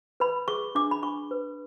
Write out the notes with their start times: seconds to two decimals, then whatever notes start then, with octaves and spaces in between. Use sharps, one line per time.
0.20 B4 B5
0.48 G#4 C#6
0.75 D4 D6
0.91 B5
1.03 D4 C#6
1.31 B4